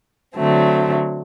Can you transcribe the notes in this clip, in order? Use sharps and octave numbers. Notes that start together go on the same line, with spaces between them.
D3 F#3 A3 C4